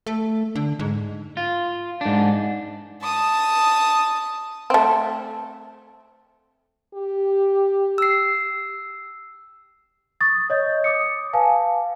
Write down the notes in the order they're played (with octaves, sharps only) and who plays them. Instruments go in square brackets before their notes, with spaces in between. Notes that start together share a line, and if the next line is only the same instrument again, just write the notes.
[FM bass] A3
D3
G#2
[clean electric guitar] F4
G#2 D4
[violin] A5 D#6
[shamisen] A3 C4
[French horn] G4
[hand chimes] E6 C7
[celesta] C#6 D#6 A6
C#5 D#5 G6
D6 D#6 C#7
B4 F5 G#5 A5